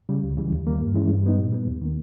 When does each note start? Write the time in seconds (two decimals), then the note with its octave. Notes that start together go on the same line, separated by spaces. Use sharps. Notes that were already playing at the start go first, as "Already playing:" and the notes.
0.09 C#3 G3
0.24 C#2
0.37 C#3 E3 G3
0.52 D#2
0.66 D#3 G3 A#3
0.80 G2
0.95 E3 G#3 C#4 E4
1.09 G2
1.23 G3 B3 D#4
1.38 A#2
1.52 G3 B3
1.67 D#2
1.81 D#3 A#3